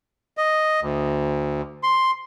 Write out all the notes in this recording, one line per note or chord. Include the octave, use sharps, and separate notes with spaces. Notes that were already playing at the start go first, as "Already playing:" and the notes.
D#5
D2
C6